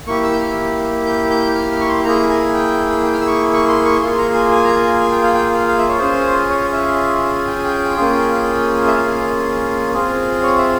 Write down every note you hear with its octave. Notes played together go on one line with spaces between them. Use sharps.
A#3 E4 G4 C#6
E6
G6
F6
G6
G6
F6
F6
C#6
C6
A#3 E4 G#4 A#5
G#5
G#5
G5
G5
F6
E6
C#6
C#6
C6
C#6
A#3 F4 G#4 C6
C6
A#5
G#5
G#5
A#5
G#5
G#5
G5
F5
G5
F5
F5
E5
C#5
C#4 F4 G#4 C5
C#5
E5
G5
G#5
G5
A#3 C#4 F4 G#4
E5
F5
C4 F4 G#4
C#5
E5